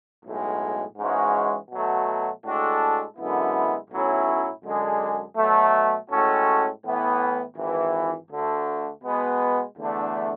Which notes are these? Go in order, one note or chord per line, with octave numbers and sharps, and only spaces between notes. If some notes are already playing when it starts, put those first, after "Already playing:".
B1 A2 G#3
G#2 E3 G#3 C#4 F#4
B2 F#3 A3
A2 G#3 D4 F#4 A4
F#2 D3 G#3 B3 E4
B1 A2 F#3 C#4 E4
F#2 D3 G#3 D4 G#4
B2 F#3 A3
A2 G#3 C#4 F#4 A4
A2 E3 B3 E4
G#1 G#2 E3
D2 D3 A3
B2 G#3 B3
E2 D3 A3 D4